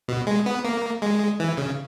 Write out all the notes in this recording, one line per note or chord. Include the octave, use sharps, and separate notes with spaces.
B2
G#3
B3
A#3
G#3
E3
C#3